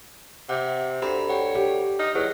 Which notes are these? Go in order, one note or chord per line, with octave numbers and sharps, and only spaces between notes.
C3 E5 F#5
D2 C4 G4 A#5 B5
C#5 F#5 G5
G4
D#4 F6
E2 F#3